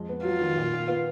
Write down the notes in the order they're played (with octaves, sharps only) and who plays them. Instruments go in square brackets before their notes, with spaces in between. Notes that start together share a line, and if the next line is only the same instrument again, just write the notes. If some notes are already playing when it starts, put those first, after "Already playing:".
Already playing: [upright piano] F2 G#3
B3
[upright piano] F#3 [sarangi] F4
[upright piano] D#3
A#2
A#2
B3